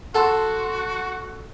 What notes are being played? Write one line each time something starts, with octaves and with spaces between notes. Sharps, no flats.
F#4 A4 F#5 A5 C6